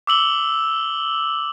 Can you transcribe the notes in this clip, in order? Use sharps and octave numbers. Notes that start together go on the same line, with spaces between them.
D6 E6 F#7 G7